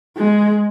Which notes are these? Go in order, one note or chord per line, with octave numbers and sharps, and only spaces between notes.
G#3